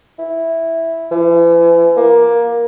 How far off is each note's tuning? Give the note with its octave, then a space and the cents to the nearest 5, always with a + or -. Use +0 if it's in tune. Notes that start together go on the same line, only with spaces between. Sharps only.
E4 -5
E3 +40
A#3 +15